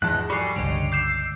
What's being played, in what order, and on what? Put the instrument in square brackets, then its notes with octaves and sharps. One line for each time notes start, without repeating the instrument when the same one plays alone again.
[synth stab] E2 [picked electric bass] G#2 F3 [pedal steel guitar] D#5 A5 F#6
[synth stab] G3 C7 [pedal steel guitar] F#4 A4 G#5
[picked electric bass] G1 C#2 [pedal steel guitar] D3 C#5 D#5
[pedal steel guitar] D6 G6 [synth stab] E6 C7